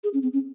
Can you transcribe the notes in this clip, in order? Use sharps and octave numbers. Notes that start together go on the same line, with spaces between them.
G#4
C#4
C4
C#4